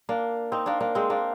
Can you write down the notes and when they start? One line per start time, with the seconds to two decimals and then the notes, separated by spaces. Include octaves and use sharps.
0.09 A#3 D4
0.52 C4 D#4
0.66 A#3 D4
0.80 A#3 D4
0.95 G#3 C4
1.10 A#3 D4